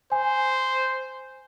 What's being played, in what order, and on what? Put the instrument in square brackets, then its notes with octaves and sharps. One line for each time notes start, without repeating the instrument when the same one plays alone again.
[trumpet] C5 [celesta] G#5